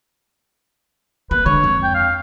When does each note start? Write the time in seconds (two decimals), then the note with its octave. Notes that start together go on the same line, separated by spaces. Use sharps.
1.31 A#3 B4
1.46 D3 G#3 C#5
1.64 F2
1.83 G5
1.95 F5